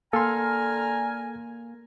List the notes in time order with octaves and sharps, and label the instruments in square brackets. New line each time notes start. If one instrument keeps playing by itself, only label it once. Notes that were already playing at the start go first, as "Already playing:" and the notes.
[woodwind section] D3 A#5 F6 [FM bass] A#3 [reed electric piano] A4 C6 [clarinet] G#5